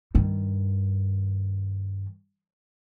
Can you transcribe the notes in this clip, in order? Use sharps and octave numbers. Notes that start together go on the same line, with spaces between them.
G2 D#3